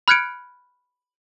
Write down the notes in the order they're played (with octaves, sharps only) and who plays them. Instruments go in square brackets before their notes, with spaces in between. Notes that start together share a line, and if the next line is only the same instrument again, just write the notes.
[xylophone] B5 F6 F#6 G#6 C#7 D7